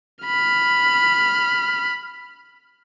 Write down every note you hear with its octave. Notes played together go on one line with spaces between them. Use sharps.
B5 F6